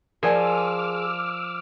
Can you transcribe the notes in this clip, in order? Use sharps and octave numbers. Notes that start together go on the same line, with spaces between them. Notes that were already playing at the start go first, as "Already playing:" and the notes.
F3 G#4 A#4 D5 G#5 D6 E6 F6